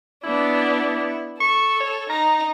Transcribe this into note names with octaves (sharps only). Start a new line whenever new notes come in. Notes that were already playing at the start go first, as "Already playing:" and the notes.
B3 D4 E4
A4 C#6
C#5
D#4 A#5